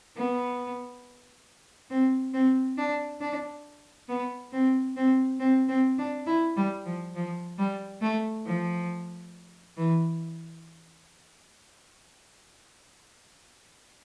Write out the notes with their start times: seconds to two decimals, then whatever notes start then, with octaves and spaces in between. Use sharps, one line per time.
0.16 B3
1.90 C4
2.33 C4
2.78 D4
3.21 D4
4.08 B3
4.52 C4
4.96 C4
5.40 C4
5.68 C4
5.98 D4
6.26 E4
6.57 G3
6.85 F3
7.15 F3
7.58 G3
8.01 A3
8.46 F3
9.77 E3